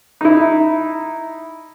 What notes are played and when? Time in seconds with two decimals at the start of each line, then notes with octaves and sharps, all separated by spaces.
0.21 D#4 E4